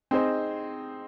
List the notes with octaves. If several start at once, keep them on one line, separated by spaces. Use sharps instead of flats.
C4 D#4 G#4 C5 D#5